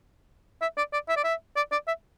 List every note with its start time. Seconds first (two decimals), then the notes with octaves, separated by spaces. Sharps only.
0.62 E5
0.77 D5
0.93 D5
1.09 E5
1.17 D5
1.24 E5
1.56 D5
1.72 D5
1.87 E5